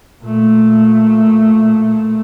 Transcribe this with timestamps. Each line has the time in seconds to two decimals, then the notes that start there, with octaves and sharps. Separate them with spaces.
0.24 A#2 A3